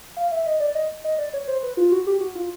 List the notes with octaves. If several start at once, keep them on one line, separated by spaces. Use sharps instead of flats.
F5
E5
D#5
D5
D#5
D#5
D5
C#5
C5
B4
F4
F#4
G4
F#4
F4